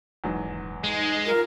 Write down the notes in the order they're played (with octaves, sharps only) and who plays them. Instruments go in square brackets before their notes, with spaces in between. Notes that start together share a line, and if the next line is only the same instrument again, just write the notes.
[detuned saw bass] D#1 [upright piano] E2 G#2 F#3
[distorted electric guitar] G#3 [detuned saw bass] D#4
[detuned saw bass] F4 [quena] A#4